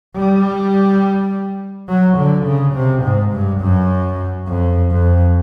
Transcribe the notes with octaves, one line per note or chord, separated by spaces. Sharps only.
G3
F#3
D3
C#3
C3
G#2
G2
F#2
F2
F2